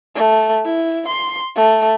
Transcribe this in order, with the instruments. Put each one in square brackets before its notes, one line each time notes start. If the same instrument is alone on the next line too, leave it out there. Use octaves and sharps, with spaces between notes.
[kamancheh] A3
E4
C6
A3